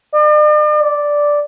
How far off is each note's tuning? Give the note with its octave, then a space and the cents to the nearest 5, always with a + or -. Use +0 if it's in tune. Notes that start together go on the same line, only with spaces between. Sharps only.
D5 +45
D5 -5